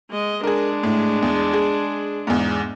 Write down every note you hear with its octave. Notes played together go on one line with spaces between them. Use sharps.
G#3 D#5
G#3 D4 G#4 A#4
A2
E2
G#4
E2 G#2